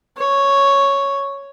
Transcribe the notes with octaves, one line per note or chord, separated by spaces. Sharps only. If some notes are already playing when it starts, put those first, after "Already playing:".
C#5